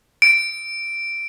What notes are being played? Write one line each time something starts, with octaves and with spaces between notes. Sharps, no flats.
D7